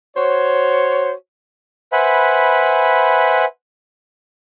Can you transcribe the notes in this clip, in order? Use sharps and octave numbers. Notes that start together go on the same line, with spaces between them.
F#4 C5 C#5
B4 C5 E5 F#5 G#5 B5